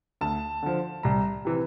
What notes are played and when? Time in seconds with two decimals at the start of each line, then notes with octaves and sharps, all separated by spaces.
0.21 D2 A5
0.63 D3 F3
1.03 C2 A#5
1.45 C3 E3